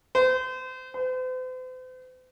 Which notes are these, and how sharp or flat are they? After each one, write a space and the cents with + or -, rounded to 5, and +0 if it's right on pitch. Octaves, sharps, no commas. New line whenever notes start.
C5 -35
C5 -45